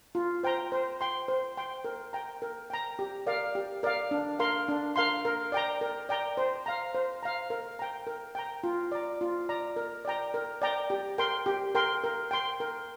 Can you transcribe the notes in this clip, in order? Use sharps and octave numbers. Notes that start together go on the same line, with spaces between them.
F4
C5 G5 A#5
C5
G5 C6
C5
G5 C6
A#4
G5 A#5
A#4
G5 A#5
G4
A#4 D5 F5
G4
A#4 D5 F5
D4
A#4 F5 C6
D4
A#4 F5 C6
A#4
D5 G5 A#5
A#4
D5 G5 A#5
C5
F5 A#5
C5
F5 A#5
A#4
G5 A#5
A#4
G5 A#5
F4
D5 A#5
F4
D5 A#5
A#4
D5 G5 A#5
A#4
D5 G5 A#5
G4
A#4 G5 C6
G4
A#4 G5 C6
A#4
G5 C6
A#4